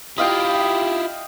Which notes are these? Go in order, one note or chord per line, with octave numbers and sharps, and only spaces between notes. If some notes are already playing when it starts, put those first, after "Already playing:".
E4 F4 G4 D#5 F5 G5